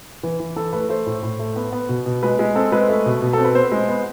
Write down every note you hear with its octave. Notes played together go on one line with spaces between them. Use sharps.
E3 B4
E3
E3 A4
A3 B4
A3 C5
A2
A2
A3
B3
B3
B2
B2
G#3 B4
G#3
C4 A4
G#3 B4
A3
B2
B2
C4 A4
B4
B3 C5
G#3
B3